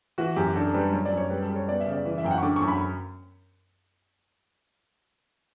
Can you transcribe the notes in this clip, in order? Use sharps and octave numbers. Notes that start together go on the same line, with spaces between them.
E3 F#4
F#2 G4
D4 A4
G3 B4
F#3 C#5
D5
F#2
C#5
G3 B4
A4
G3
C#5
B3 D5
E5
C#3
D5
E3
E5
F#2 G5
F#5
C#6
D3 D6
C#6
F#2
B5